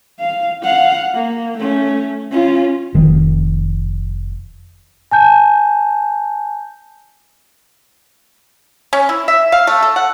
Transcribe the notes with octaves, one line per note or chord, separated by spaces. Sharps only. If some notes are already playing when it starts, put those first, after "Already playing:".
F5
F5 F#5
A#3
A3 C#4
C#4 F4
F1 D#3 F3
G#5 A5 G6
C#4
E4
E5
F5
A3
A4
F#5